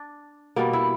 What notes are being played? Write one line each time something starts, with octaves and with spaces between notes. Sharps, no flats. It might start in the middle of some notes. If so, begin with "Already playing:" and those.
Already playing: D4
B2 G3 A#3
E4